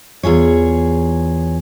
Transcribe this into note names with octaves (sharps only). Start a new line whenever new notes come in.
E2 F4 G#4 C#5